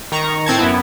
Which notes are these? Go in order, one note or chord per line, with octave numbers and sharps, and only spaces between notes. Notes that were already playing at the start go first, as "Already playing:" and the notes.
D#3 A#5 C#6
A2 C4 A5 G#6
F#2 B3 E4